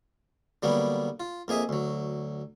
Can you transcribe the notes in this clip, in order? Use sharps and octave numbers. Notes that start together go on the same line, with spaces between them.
D3 F#3 G3 A#3 B3
F4
F2 A#3 G#4 D#5 E5
D2 F#3